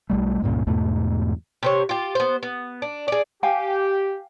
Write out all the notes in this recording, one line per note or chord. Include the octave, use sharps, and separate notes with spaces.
B1 G2 G3 A3
C#2 G2 A#2 C#3
E2 G#2 B2 A3
C3 C5 C#5
F4 G4
B3 C5
B3
D4
G#4 D5
G4 F5 G5 G#5